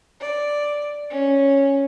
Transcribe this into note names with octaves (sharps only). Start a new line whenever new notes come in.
D5
C#4